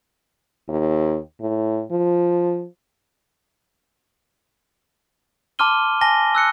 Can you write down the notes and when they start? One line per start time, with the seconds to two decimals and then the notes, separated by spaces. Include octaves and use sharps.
0.68 D#2
1.40 A2
1.91 F3
5.59 A5 C6 D6 F6 D#7 G7
6.01 G#5 A5 A#6 G7
6.35 E6 F#6 C#7